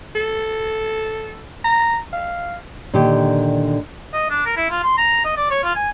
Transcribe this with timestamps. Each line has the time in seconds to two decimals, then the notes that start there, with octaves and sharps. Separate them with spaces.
0.15 A4
1.64 A#5
2.13 F5
2.93 A#2 D3 D#3 G4
4.13 D#5
4.30 D4
4.46 A#4
4.57 E4
4.71 F4
4.83 C6
4.98 A#5
5.25 D#5
5.37 D5
5.51 C#5
5.63 F4
5.75 G#5